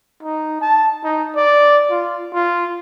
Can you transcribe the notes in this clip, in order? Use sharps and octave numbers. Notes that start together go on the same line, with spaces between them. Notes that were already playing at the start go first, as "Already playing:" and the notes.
D#4
A5
D#4
D5
F4
F4